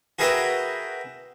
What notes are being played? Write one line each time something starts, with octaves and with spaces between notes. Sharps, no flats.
F#4 G#4 A#4 B4 E5 G5